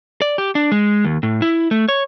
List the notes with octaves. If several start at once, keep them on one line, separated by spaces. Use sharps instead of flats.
D5
G4
D4
G#3
D#2
A2
E4
A3
C#5